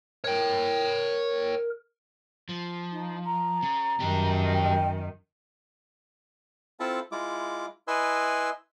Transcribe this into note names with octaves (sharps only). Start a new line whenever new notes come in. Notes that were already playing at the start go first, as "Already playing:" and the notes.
A#4 C#5 G5
F3
D#4
A#5
C#3
F#2 D#3 D4 G4
G5
C4 E4 F4 A4 E5 A5
G#3 E4 F4 D6
E4 B4 D#5 G#5 C6 E6